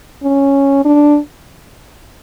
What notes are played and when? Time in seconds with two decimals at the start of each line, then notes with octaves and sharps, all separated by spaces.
0.23 C#4
0.85 D4